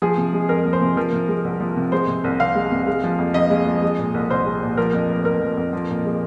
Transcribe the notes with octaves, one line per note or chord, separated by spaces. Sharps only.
F3 G#4
C3
G#3
F2 A#4
F3
C5
C3
F3 A#4
C3
G#3
C2
F3
C3
G#3 C5
C3
C2
C2 F5
G#3
C3
G#3
F3
F2
F2 D#5
G#3
F3
G#3
A#2
C2
C2 C5
G#3
A#2
F3 A#4
F2
F1
F1 A#4
F3
F2
F3
A#2
G#3